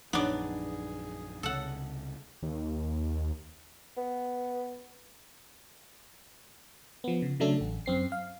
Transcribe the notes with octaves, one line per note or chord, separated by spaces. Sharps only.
A#1 F#2 B3 D4 D#4 G#4
C#2 C3 A4 F#5
D#2
B3
F3 B3
C#3
C#3 F#3 A3 D4 A4
A1
F#2 C4 C7
F5